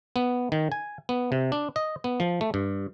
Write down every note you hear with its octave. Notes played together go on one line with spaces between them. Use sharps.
B3
D#3
G#5
B3
C3
D4
D#5
B3
F3
A3
G2